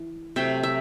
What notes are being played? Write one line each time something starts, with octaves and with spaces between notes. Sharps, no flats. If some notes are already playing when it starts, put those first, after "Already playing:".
Already playing: E3
C3 F#3 A3 E5 G5
E5